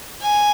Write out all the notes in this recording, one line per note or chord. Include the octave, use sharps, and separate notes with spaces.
G#5